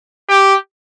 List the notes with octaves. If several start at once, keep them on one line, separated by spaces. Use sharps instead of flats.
G4